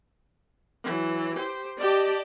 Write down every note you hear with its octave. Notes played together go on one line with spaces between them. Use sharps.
E3 F#3
G4 C5
G4 D5 D#5 A5